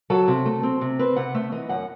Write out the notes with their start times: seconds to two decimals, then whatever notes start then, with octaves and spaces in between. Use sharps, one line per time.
0.10 F#3 A4
0.28 C3
0.45 A3
0.63 C4
0.81 C3
0.99 C4 B4
1.16 C3 F#5
1.34 A3 E5
1.52 E3 D#5
1.69 F#2 F#5